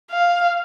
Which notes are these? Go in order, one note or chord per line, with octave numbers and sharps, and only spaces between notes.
F5